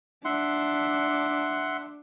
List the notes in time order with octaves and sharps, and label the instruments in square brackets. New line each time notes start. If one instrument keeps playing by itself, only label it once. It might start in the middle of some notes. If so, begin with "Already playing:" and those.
[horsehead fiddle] D4 [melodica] E5 F#5 C6